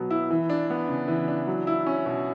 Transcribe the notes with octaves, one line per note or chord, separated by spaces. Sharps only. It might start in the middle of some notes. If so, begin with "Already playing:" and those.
Already playing: B2 F#3 B3
E4
E3
D4
B3
C#3
E3
D4
F#3
E4
C#4
B2